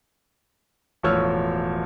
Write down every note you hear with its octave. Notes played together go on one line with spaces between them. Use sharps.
E1 A2 F3 C#5 E6 F6